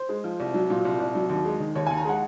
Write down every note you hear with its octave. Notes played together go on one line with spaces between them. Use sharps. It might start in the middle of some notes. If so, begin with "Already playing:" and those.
Already playing: C5
G#3
F3
C2
F#3
A#2
C2
C2
F#3
D#2
G#3
D#3
D#2 C#5
D#2 G#5
A#5
G#3 F#5